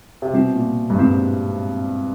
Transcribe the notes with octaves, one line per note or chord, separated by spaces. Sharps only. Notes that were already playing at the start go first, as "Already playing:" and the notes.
C3
B2 G3 C4 E4
A#2
G2
G#2 G3 C4 E4